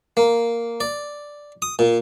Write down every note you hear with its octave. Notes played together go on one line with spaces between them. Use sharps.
A#3
D5
D#6
A#2